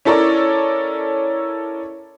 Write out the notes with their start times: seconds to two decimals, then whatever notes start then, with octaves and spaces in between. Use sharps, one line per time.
0.05 C#4 E4 A4 A#4 C#5 D5